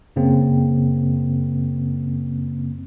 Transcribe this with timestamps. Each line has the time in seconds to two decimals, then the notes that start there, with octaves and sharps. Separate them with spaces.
0.16 F#2 C#3 A#3 C4